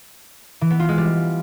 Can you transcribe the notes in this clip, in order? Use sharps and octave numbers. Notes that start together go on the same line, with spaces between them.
E3
B3
F4
G#3
G3